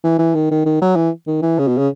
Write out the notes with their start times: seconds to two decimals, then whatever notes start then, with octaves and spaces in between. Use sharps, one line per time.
0.04 E3
0.19 E3
0.34 D#3
0.51 D#3
0.66 D#3
0.82 F#3
0.96 E3
1.27 D#3
1.42 E3
1.59 C#3
1.68 B2
1.78 C#3